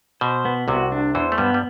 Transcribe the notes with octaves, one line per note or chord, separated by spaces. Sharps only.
B2 C5
B3
C2 C3 F#4
D4
E2 E3 C5
A3
G2 G3 B3
G3